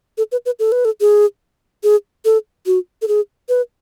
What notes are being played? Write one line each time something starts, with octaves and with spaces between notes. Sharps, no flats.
A4
B4
B4
A4
B4
A4
G#4
G#4
A4
F#4
A4
G#4
B4